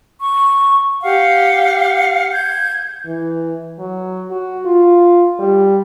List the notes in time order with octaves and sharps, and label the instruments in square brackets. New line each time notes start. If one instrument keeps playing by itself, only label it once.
[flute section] C#6
G4 F5 F#5
G6 G#6
[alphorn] E3
F#3
F#4
F4
G3